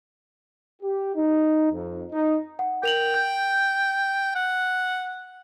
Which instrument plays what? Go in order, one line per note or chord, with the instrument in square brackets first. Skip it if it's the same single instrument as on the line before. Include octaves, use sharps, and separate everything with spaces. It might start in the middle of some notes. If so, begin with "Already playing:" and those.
[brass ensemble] G4
D#4
F2
D#4
[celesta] F#5
[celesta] A#4 F7 F#7 [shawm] G5
[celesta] G6
[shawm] F#5